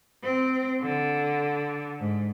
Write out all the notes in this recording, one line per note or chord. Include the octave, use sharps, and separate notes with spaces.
C4
D3
G#2